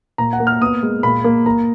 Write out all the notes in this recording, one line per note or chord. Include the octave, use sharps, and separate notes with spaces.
A#2 A#5
F#5
A#3
F6
B3 D#6
G#3
A#2 B5
A#3
A#3 A#5